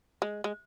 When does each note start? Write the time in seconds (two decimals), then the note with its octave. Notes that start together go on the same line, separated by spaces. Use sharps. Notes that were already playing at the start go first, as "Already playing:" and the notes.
0.22 G#3
0.44 G#3